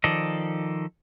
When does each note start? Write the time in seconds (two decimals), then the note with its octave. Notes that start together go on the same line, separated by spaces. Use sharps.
0.04 D#3 F3 A4 D5 D#5